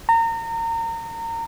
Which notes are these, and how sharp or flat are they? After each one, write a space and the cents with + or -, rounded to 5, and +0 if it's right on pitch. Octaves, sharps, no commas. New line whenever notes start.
A#5 -30